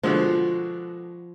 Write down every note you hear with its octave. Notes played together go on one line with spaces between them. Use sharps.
B2 D3 F3 G#3